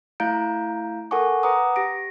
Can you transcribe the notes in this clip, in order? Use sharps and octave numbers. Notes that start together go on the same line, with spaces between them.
A3 E4 F5 A#5 G6 D7
A4 A#4 F#5 G#5 C#6 D6
B4 F#5 A#5 D6 D#6
G4 A#6 D7